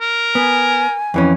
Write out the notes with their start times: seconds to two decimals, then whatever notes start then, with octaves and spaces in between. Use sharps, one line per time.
0.01 A#4
0.35 B3 G#5
1.14 F2 E3 C#4